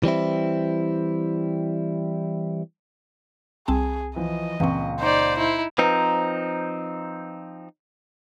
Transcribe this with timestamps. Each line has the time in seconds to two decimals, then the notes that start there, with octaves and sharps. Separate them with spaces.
0.03 E3 G3 C4 E4
3.68 C2 C4 G#4 A5
4.16 E3 F3 D#5
4.60 C#2 A#2 E3 C4 C#6
5.00 D#4 C5 D5
5.38 D#4 E4
5.78 F3 C4 D#4 B4 A#5